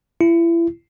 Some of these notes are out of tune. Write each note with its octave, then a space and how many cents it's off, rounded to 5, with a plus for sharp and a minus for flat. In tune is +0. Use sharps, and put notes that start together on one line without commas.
E4 +30